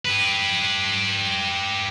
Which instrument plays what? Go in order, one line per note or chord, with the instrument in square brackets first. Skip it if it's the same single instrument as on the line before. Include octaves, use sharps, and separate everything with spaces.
[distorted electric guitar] G4 B4